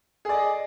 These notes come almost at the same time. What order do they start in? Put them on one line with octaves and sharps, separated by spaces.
G#4 D5 D#5